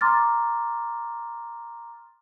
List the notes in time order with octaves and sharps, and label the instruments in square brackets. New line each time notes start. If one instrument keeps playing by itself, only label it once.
[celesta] A#5 C6 D6 F6 A6